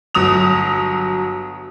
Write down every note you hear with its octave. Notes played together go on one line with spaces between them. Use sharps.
G1 F#3 D#6 F7